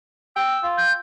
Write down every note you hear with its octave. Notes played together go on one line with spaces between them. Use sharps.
G5 E6
F4
G6